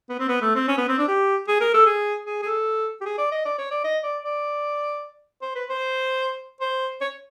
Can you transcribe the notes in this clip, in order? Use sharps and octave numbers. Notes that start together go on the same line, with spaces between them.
B3
C4
B3
A3
C4
C#4
B3
C4
D4
G4
G#4
A#4
A4
G#4
G#4
G#4
A4
G4
G#4
D5
D#5
D5
C#5
D5
D#5
D5
D5
C5
B4
C5
C5
C#5